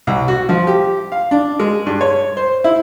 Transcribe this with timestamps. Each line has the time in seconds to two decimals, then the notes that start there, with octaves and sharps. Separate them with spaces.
0.07 C2
0.28 F#4
0.49 F3
0.67 G4
1.12 F5
1.31 D4
1.60 G#3
1.86 G2
2.01 C#5
2.37 C5
2.64 E4